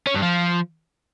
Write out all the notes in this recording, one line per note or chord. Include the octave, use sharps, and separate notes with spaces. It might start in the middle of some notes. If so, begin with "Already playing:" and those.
C#4
G2
F3